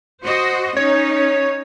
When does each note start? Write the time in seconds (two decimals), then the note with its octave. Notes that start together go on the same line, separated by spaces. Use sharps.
0.24 F#4 C5 D#5
0.77 C#4 D#4 C#5